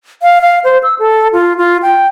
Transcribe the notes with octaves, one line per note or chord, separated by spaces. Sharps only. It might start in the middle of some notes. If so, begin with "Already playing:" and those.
F5
F5
C5
E6
A4
F4
F4
G5